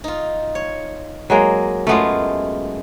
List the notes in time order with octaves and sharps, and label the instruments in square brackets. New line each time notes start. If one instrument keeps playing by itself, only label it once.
[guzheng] D#4 F4
C#5
[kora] F#3 G#3 A#3
[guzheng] F#2 G#3 [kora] A3 B3 F4